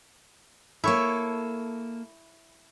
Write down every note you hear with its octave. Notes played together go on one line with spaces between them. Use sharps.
A#3 E4 A4 C#5